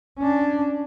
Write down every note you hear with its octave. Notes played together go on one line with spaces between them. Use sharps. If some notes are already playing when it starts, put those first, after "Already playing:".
C#4 D4